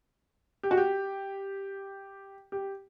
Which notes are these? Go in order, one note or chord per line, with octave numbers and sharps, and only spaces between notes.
G4
F#4
G4
G4